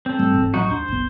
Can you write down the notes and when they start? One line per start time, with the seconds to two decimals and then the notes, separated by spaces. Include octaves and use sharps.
0.06 C4 A4
0.19 G#2 G3 A3
0.34 E1 G#2
0.54 A1 F#3 D#4 F#4
0.70 D#2 D4 C5
0.88 F#1 B1 B3